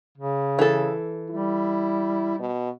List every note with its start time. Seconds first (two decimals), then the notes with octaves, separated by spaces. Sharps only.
0.18 C#3
0.59 E3 A4
1.30 G3 E4
2.39 B2